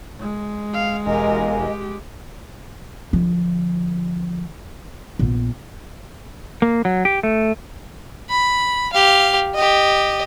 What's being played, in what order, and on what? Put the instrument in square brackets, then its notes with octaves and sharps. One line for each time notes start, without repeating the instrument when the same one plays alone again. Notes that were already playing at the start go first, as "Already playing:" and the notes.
[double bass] G#3
[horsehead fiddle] F5
[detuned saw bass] E1 [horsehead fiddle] G4 A#4 [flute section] D#5 F5 G#5
[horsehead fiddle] G4
[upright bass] D3 F3
A#1 B3
[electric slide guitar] A#3
F#3
G4
A3
[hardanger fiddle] B5
G4 F5
G4 D#5